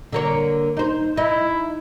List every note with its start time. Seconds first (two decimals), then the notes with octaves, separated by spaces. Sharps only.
0.12 D3 A#3 C#5
0.77 D#4 C5
1.17 D#4 E4